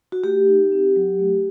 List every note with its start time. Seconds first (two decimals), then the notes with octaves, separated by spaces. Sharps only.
0.12 F#4
0.24 A3 G4
0.47 D#4
0.72 C4
0.96 F#3
1.19 A3